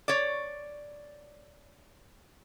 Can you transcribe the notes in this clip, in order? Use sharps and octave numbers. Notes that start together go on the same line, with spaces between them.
C#5 D5